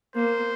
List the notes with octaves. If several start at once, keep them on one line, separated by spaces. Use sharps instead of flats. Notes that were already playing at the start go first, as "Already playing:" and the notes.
A#3 C5